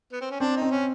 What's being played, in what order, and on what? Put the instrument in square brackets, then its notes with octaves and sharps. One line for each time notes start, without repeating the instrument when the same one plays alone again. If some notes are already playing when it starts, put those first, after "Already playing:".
[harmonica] B3
C4
C#4
[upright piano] C4 [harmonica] D4
[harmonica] D#4
[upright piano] C4
[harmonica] C#4